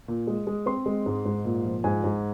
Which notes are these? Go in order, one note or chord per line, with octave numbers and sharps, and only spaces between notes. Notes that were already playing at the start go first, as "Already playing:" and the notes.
A#2
G#3
G#3
C4 C6
G#3
G#2
G#2
A#2
F3
G#2 G#5
G#2